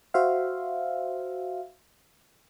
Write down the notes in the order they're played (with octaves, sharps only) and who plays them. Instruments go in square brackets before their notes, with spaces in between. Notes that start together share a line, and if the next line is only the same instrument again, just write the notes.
[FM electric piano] F#4 C5 E5 F5